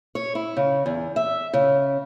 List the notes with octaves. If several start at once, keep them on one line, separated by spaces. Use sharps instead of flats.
C#5
E4
C#3
E2
E5
C#3